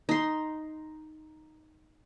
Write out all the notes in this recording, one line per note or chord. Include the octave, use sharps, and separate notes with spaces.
D#4 C6